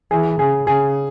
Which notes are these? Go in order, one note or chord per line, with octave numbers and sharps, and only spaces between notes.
E3 G#4
C#3 G#4
C#3 G#4